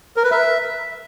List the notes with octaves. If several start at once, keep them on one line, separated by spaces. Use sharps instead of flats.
A#4
B4
E5